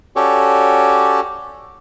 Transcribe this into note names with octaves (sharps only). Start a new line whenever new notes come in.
C#4 F#4 G4 A4 C#5 D5